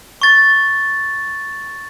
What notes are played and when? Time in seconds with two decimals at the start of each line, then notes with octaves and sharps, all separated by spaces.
0.22 C#6 A6